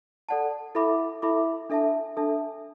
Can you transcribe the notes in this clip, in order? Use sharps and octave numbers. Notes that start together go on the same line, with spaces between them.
A4 D5 F#5 A5
E4 A4 E5 B5 D6
E4 A4 E5 B5 D6
D4 A4 E5 A5
D4 A4 E5 A5